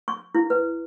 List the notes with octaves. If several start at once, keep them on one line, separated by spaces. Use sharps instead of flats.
C#6
E4
B4